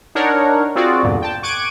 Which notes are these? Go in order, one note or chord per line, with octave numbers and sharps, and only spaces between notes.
D4 D#4 A#4 C#5 F#5
C4 F4 F#4 G#4 D5
E2 G2 A#2 D3
G5 A5
C#6 D6 F#6 G#6 D7 D#7